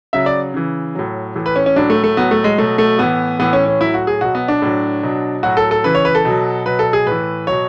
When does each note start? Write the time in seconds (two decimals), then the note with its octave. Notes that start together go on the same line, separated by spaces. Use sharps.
0.13 C#3 F#3 E5
0.26 D5
0.54 C#3 E3
0.95 A2 F#3
1.35 A2 E3
1.46 B4
1.56 C#4
1.66 C#4
1.76 A2 F#3 D4
1.90 A3
2.04 A3
2.17 A2 F#3 B3
2.31 A3
2.44 G#3
2.58 B2 F#3 A3
2.78 A3
2.98 A2 E3 B3
3.39 A2 E3 B3
3.53 C#4
3.66 C#4
3.80 A2 F#3 E4
3.94 F#4
4.07 G#4
4.21 B2 F#3 F#4
4.35 B3
4.48 D4
4.62 A2 F#3
5.03 B2 F#3
5.43 A2 F#3 F#4
5.57 A4
5.71 A4
5.84 C#3 E3 B4
5.95 C#5
6.05 B4
6.15 A4
6.25 B2 F#3
6.66 B2 F#3 B4
6.79 A4
6.93 G#4
7.06 A2 E3 B4
7.47 B2 F#3 C#5